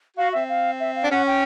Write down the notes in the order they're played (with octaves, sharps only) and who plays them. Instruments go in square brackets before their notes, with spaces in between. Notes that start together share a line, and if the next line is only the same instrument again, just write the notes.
[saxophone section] F#4 [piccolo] F5
[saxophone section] C4 [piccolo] E5
[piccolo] F5
E5
F5
[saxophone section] D4
[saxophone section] C#4 [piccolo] F#5
[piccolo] G5